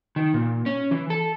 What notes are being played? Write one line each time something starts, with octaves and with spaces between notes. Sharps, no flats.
D#3
A#2
C#4
E3
A4